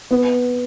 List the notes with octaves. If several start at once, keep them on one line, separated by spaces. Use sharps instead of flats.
B3